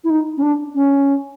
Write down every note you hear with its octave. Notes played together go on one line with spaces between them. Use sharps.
E4
D#4
C#4
D4
C#4